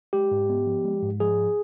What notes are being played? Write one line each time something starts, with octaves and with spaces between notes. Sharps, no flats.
G#3 G4
G#2
B3
F3
G#3
G#2
F3 G#4